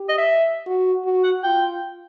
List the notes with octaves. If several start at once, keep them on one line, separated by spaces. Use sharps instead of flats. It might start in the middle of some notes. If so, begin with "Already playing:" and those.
Already playing: G4
D#5
E5
F#4
F#4
F#5
F4 G5